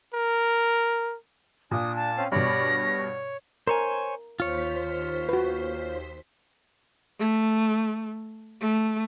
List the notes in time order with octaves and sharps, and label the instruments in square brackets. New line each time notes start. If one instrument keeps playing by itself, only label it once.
[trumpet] A#4
[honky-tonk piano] A#2 [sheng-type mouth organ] D4 [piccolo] D#6
[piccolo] A5
[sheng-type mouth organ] C4 C#4 F5
[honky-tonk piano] G2 B2 [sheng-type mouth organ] C#5 D5 B5 [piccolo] A#6
[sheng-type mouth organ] C#5
[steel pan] A#4 [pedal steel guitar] C5 C#5 G#5
[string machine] D#2 C5 B6 [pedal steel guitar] F4 C#5
[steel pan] F#4 B4
[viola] A3
A3